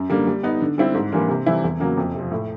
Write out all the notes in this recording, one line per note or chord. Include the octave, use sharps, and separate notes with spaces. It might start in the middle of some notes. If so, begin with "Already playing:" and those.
Already playing: F#2
D3 G3 A#3
G3
B3 D#4
D3
G3 C4 E4 G4
G#2
E3 G3 A#3 D4
C3
E3 G3 C4 E4
E2
C#3 F#3 A#3
F2
C3 F3
A2